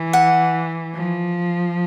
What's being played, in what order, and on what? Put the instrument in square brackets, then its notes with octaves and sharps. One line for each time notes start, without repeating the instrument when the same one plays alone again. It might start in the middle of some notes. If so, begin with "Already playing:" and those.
Already playing: [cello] E3
[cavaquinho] F#5
[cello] F3